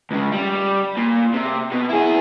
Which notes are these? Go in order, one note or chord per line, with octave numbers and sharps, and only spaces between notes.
C#2 C#3
G3
A#2
C3
B2
E4 G#4